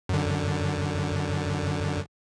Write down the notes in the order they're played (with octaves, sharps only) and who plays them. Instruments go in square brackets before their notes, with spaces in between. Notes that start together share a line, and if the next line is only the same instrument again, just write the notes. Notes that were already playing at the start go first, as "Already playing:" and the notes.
[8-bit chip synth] F#2 D3